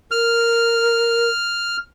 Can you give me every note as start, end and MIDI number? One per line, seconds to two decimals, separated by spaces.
0.11 1.29 70
0.11 1.77 89